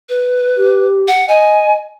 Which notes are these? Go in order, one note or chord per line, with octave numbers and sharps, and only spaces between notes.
B4
G4
F#5
D#5 G#5